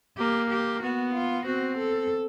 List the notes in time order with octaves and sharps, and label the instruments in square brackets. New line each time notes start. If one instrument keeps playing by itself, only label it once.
[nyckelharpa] A#3 [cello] G4
[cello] G4
[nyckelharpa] B3 [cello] F#4
[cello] F4
[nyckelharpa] C4 [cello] F#4
[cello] A4